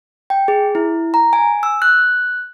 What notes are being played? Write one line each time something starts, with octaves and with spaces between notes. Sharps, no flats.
G5
G#4
E4
A#5
G#5
E6
F#6